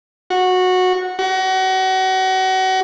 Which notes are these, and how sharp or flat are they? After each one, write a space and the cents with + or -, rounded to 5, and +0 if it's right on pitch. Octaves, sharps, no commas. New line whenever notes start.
F#4 -15
F#4 +30